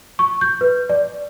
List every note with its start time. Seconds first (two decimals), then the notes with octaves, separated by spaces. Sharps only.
0.19 C#6
0.41 G6
0.61 B4
0.89 D5